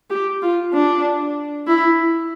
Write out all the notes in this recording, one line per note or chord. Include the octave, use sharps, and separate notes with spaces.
G4
F4
D4
E4